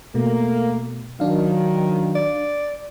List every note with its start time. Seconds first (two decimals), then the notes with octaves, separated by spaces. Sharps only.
0.15 B2 A3 A#3
1.20 D#3 F#3 D4 F5
2.15 D5